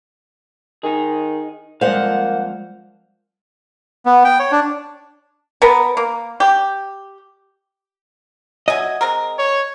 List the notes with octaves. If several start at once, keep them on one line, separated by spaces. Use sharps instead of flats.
D#3 D#4 G#4
F2 G3 G#3 A#3 C5 D5 F5 F#5
B3
G5
C#5
D4
B3 A#4 B4 A5
A#3
G4
F#3 D#5 E5 G#5
G#3 C4 A#4
C#5